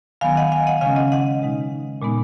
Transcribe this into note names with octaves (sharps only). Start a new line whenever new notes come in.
D#3 F#3 B3 F5 G#5
D#5 F#5
F5 G#5
D#5 F#5
C#3 G#3 C#4 F5 G#5
D#5 F#5
D#5 F#5
B2 G#3 D#4
A#2 G#3 B3 D#4